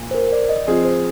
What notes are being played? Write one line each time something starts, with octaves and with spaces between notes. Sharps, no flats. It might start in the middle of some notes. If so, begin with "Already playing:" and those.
Already playing: A#2
C5
A#4
D5
D#5
F3 C4 F4 G#4
C5